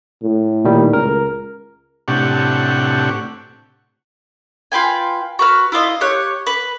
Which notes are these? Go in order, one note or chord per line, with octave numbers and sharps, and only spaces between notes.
A2
A#2 D#3 G3
C#2 A#4
A2 C3 D4 G4 F#5 C#6
F4 B4 G5 G#5
F#4 B4 F6
E4 F4 D5 D#5
G4 C#5 F#6
B4